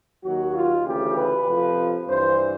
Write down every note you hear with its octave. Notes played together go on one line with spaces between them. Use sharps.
D#2 D#3 F#3 F#4
F4
D2 C#3 E3 G4
B4
F2 C3 F3
G2 E3 C5